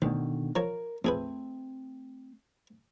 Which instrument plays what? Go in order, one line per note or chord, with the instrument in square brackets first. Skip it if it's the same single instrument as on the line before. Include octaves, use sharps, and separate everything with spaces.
[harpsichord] D2 [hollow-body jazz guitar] B2 D3 D#3
[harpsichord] F3 C#5 [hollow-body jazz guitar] A#4 A#5
[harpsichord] F2 G#4 B4 [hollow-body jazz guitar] A3 C4